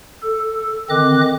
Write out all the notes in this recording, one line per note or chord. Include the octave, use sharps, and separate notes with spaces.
A4
D3 D#3 C4 D#5 D6 F#6